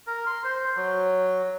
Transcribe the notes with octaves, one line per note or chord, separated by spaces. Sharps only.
A#4
C6
C5
F#3